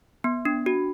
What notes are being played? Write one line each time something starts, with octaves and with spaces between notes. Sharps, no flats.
B3
D4
F#4